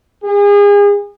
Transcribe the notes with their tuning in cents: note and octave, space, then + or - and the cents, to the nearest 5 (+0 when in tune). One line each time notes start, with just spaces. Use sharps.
G#4 -35